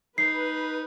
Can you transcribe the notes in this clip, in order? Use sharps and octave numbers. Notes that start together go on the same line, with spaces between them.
D#4 B4 C7